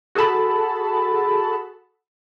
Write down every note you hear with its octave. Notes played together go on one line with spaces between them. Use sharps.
F#4 G#4 A4 A5 B5